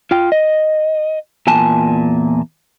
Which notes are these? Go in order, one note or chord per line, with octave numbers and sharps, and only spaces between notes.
F4 G5
D#5
E2 A#2 G#5 A5